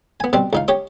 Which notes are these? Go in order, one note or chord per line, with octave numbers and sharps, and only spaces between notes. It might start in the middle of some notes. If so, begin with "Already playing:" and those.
B3 G#5
B2 G3 C4
C#2 D#4 F5
G4 C#5 D#6